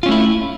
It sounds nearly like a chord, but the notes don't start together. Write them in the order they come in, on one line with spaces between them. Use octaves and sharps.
F4 C#4 A3 E4